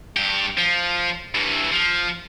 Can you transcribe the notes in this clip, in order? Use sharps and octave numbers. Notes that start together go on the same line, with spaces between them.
G2 G4
F3
G2 E3
F3